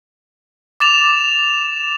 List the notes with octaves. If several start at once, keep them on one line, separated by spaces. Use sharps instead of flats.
D6 A6 E7 F7